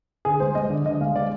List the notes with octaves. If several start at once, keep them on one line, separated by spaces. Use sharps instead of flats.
D3 G#4
G#3 C5
G#3 D#5
D3 D5
D3 D#5
G#3 F5
G#3 D5